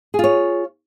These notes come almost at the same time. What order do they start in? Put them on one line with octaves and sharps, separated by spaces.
G#4 F4 C#5